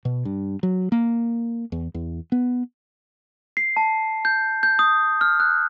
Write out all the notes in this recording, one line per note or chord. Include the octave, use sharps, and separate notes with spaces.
B2
G2
F#3
A#3
E2
E2
B3
C7
A5
G6
G6
D#6
F6
F#6